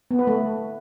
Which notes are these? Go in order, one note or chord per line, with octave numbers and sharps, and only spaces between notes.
B3
B4
A3